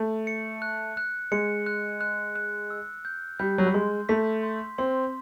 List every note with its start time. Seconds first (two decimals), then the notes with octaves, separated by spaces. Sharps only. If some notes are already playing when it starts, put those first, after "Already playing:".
Already playing: A3
0.27 C#7
0.62 F#6
0.97 F#6
1.32 G#3 C#7
1.66 F#6
2.01 F#6
2.36 F#6
2.70 E6
3.05 G6
3.39 G3 G6
3.58 F#3
3.67 G3
3.74 G#3 C6
4.09 A3 B6
4.43 C6
4.78 C4 C6